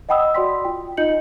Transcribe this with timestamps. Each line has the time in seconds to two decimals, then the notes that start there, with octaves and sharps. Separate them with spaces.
0.09 D#5 F#5 G5 B5 D#6 E6
0.34 F#4 D5 C6 B6
0.65 F4 G5
0.97 D#4 F4 D#5 G6 C#7 F#7